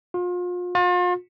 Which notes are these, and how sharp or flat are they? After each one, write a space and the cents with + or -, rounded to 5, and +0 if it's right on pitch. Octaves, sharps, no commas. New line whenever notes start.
F4 +35
F4 +40